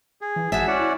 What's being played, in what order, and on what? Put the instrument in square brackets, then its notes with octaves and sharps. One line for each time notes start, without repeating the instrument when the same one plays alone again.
[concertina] G#4
[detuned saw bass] E3
[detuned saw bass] G#1 [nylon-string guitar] F#4 E5 [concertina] G#4 A5
[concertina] C#4 D5 F#5 [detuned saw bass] E4